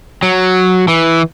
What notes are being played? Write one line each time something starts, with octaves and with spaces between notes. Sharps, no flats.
F#3
E3